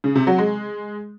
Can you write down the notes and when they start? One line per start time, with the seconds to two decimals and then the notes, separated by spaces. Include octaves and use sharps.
0.04 C#3
0.15 C3
0.27 F#3
0.38 G#3